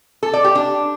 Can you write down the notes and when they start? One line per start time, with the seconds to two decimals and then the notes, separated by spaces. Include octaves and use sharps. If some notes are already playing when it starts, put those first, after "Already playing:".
0.23 A4
0.33 D5
0.44 G4
0.55 D4